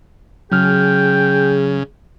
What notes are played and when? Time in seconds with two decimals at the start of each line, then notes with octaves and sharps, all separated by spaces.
0.52 C#3 F#3 G#4 G5 F6